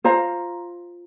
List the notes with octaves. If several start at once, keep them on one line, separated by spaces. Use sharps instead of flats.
F4 C5 F5 A#5